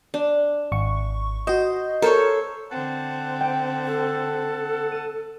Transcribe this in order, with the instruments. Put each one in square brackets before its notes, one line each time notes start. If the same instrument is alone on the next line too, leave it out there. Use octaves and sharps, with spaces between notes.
[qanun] D4
[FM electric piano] G#1 C#6
[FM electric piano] F#4 D#5 [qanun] C5
[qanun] A4 C5 C#5 [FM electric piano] A#4
[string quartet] D3 C4 [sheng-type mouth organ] F#5 A5
[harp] G5
[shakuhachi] A4
[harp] D#7 E7